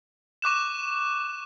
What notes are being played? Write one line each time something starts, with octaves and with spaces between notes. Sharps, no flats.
C#6 D6 F#6 E7